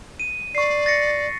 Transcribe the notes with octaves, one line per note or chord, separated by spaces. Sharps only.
D#7
D5 C#6 C7
A6 A#6 C#7